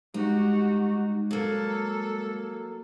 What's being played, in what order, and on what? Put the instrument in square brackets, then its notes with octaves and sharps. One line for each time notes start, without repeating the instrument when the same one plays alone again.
[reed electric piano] G3 G#3 [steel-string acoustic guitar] D#4 [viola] F#4 G4
[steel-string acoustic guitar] F#3 A#3 [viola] A4